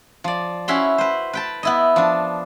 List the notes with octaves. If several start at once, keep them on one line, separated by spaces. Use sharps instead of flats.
F3 D5
C#4 E4 F#4 E5 B5 C6
B4 C5
B4 G5 A5
B3 E4 D#5
F3 D4